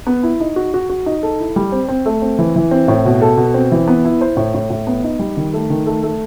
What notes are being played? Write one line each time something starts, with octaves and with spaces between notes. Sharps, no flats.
B3
E4
D#4
F#4
F#4
F#4
D#4
A4
E4
G3
C4
C4
A3
C4
E3
E3
C4
A2
B2
A4
B2
C4
E3
B3
E4
C5
A2
A2
A2
B3
D#4
G3
D#3
A3
D#3
A3
A3